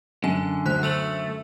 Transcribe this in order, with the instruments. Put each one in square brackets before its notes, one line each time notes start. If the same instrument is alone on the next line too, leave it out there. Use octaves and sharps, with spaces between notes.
[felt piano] F#2 [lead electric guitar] D3 [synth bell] G#5
[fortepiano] D2 [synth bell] C5 F#6
[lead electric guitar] A3 [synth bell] E6 F7 F#7